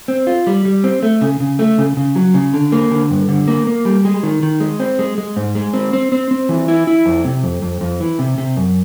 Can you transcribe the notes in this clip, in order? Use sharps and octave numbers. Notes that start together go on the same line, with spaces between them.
C4
F4
G3
G3
C4
A3
C#3
C#3
A3
C#3
C#3
F#3
C#3
D3
A#3
D3
G2
D3
A#3
A#3
G3
G#3
D#3
D#3
G#3
C4
G#3
G#3
G#2
G#3
C4
C4
C4
C4
E3
E4
E4
F2
C3
F2
F2
F2
E3
C3
C3
F#2